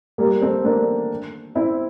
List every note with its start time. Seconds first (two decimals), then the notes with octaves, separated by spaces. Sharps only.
0.18 G3 A#3
0.42 A3 C4
0.64 A#3 D4
1.55 C4 E4